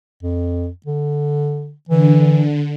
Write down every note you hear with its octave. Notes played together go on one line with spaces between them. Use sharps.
F2
D3
D3 E3